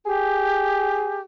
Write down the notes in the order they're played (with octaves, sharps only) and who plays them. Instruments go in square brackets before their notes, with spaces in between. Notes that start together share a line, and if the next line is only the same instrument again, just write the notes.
[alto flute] G4 [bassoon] G#4